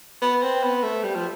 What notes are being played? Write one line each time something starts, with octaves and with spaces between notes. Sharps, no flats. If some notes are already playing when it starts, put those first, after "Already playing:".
B3
C4
B3
A3
G3
F3